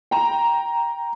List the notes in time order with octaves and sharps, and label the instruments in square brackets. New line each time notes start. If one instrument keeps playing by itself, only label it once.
[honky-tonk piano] G5 A#5